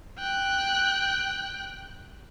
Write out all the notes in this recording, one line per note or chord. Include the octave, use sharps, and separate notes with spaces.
G5 F#6